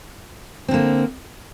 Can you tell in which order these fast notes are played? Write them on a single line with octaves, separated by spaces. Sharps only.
C4 D3 A#3